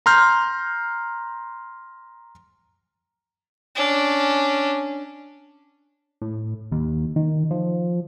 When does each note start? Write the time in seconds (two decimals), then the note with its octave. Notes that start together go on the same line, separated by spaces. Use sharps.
0.06 A#5 C6 F6 G6
3.75 C#4 D4
6.22 A2
6.72 D#2
7.16 D#3
7.51 F3